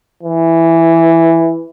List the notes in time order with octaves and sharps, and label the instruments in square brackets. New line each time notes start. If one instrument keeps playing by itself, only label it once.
[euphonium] E3